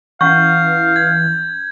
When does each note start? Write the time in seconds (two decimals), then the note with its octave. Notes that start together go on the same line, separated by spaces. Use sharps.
0.21 E3 C#4 F5 F#5 C#6 G6
0.96 G#6